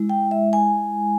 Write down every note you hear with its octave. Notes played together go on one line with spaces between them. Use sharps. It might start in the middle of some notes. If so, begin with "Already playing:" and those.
Already playing: G#3 E4
G5
E5
G#5